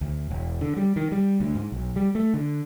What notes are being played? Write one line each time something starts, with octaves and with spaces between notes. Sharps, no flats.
D2
E1
D3
G3
D#3
G3
D2
G#2
B1
G3
A3
D3